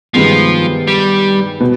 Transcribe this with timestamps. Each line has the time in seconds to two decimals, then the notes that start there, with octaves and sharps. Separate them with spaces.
0.14 G2 D#3 F3 G#3 B3
0.88 G3
1.60 B2